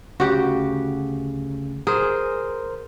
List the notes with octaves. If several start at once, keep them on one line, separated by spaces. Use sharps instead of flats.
D2 C#3 F#4 G4
G#4 A#4 C5